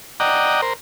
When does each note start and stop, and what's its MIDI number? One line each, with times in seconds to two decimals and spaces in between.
0.20 0.61 74
0.20 0.61 75
0.20 0.61 78
0.20 0.61 79
0.20 0.61 82
0.62 0.73 70
0.62 0.73 72